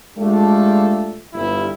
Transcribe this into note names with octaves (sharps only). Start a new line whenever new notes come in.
G#3 A3 D4 F4 G4 A4
G1 G3 E4